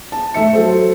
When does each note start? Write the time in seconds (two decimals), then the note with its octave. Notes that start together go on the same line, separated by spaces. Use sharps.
0.12 A5
0.34 A3 E5 C#7
0.53 F#3 A4 C5